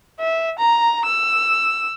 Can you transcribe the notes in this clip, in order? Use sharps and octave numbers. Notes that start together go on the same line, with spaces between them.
E5
A#5
E6